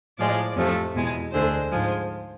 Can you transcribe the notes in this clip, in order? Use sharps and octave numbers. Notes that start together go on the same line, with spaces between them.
A2 F3 G#3 D5
F2 C3 F3 A3
E2 B2 G#3
D2 D3 G#3 C5
G#2 F3 G#3